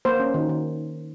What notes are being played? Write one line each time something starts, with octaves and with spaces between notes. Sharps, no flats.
A#3 C5
C#4
D#3
D#3